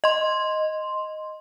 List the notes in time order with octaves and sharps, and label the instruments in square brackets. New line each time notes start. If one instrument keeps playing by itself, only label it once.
[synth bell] D#5 C6